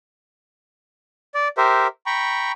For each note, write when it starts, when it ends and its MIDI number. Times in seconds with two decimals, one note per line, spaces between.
1.34 1.48 74
1.57 1.87 67
1.57 1.87 70
1.57 1.87 72
1.57 1.87 76
2.06 2.52 79
2.06 2.52 82
2.06 2.52 83
2.06 2.52 85